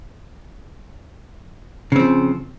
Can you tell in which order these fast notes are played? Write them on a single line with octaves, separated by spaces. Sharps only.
C#3 C4 F3